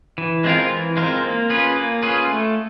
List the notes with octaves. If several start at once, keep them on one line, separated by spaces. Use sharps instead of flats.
E3
G#3 C4 F4 A#4
E3
G#3 C4 F4 A#4
A#3
C#4 F4 G#4 B4
A#3
C#4 F4 G#4 B4
A3